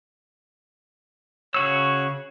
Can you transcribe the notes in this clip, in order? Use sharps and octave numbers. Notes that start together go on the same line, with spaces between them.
C#3 F#4 C#5 E6